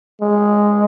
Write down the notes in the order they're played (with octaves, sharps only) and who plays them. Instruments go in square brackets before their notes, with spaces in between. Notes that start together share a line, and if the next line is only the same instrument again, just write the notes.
[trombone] G#3